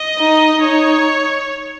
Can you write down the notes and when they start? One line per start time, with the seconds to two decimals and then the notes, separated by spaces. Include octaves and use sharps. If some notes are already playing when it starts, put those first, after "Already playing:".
Already playing: D#5
0.18 D#4
0.61 D#4 C#5